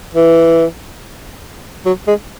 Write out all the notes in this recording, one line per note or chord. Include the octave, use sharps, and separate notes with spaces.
E3
F#3
G#3